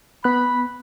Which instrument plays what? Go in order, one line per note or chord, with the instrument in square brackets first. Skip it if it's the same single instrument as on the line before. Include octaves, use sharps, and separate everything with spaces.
[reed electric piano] B3 F#6 [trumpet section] B5